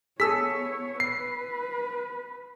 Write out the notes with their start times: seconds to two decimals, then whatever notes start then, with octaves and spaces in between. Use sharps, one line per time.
0.20 B3 G#4 A4 C#5 E6 B6
1.00 B4 C7